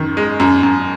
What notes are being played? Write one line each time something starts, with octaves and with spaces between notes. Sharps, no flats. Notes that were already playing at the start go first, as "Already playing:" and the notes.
Already playing: F#2 D#3
G#3
F#2
F#2